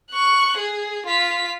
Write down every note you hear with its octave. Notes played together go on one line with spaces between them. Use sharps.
C#6 F#6
G#4
F4 B6